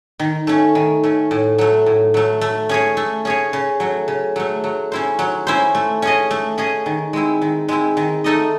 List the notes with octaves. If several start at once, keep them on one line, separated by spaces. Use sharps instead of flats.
D#3
A3 C#4
D#3
A3 C#4
A2
F#3 A3
A2
F#3 A3
A3
C#4 G#4 C#5
A3
C#4 G#4 C#5
C#3
F#3 A3
C#3
F#3 A3
F#3
C#4 E4 C5
F#3
C#4 E4 C5
A3
C#4 G#4 D#5
A3
C#4 G#4 D#5
D#3
G#3 C4 E4
D#3
G#3 C4 E4
D#3
A3 D#4 A4 D#5